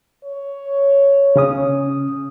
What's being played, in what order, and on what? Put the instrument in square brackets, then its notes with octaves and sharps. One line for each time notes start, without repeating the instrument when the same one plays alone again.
[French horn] C#5
[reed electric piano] C#3 C#4 D#6